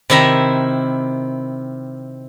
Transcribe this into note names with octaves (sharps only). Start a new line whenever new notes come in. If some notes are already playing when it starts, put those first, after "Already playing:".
C3 D#3 E4 E5 A#5